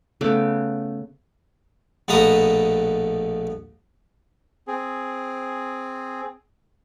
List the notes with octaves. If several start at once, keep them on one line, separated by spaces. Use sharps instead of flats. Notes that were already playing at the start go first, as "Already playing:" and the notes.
C#3 A3 B3 D6
A#1 B2 A3 B3 A#5 D#6
C4 G#4